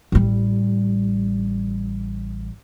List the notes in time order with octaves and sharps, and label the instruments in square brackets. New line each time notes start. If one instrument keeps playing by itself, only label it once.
[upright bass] A1 G3